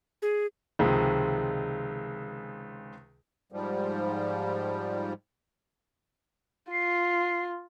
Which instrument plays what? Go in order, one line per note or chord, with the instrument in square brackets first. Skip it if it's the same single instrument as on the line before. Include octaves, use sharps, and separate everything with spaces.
[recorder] G#4
[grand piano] C#2 C3 D#3 F3 G#3
[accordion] G#2 F3 G3
[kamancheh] F4 [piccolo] C7